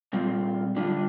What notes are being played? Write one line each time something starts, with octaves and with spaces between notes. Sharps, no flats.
A#2 G3 C4 F4
D3 G3 D4 F4